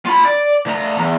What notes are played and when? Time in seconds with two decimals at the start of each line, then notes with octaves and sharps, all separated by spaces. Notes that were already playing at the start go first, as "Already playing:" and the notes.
0.06 F4 B5
0.25 D5
0.66 D2 A#5
0.98 E2